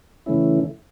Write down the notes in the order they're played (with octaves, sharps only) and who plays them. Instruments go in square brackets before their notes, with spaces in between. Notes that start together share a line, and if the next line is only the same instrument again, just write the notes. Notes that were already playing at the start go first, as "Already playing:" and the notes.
[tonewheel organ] C#3 E3 A3 C#4 E4